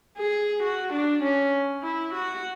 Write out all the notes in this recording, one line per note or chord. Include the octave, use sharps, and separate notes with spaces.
G#4
F#4
D4
C#4
E4
F#4